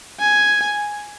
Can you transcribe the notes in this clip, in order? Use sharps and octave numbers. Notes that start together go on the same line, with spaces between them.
G#5